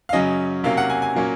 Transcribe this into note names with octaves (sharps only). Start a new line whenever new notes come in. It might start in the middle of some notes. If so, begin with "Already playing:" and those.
F5
F#2 C#3 F#3 C#4 D#5
C3 F#3 A#3 C#4 F5
F#5
G#5
G#5
A#2 F#3 A#3 C#4